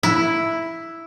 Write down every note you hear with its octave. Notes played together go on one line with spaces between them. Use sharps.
E4